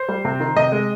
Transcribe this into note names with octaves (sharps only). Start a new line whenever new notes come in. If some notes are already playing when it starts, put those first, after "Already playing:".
Already playing: C5
G3
C3
D#3
C3 D#5
G#3